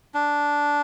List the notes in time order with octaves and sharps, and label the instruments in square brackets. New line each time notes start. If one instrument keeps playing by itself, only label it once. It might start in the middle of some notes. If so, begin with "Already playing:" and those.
[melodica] D4